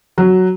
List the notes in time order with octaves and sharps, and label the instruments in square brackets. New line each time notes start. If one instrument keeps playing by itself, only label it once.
[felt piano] F#3